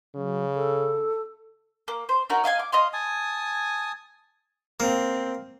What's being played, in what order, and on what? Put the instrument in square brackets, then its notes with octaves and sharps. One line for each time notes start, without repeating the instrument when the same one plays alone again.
[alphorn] C#3 [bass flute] F#3
[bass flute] A4
[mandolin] A#3
C5
C#4 D#4 F#4 A#4
D#5 F5 F#5 G#5
D6
D#5 F5 C6
[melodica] G#5 A5 D#6
[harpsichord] A#3 [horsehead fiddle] C4